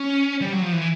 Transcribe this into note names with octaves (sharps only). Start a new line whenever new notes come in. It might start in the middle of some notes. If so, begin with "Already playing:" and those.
Already playing: C#4
G3
F#3
F3
E3